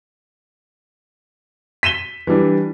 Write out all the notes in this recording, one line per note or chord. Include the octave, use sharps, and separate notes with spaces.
B6 D#7 E7 G7
E3 G3 D4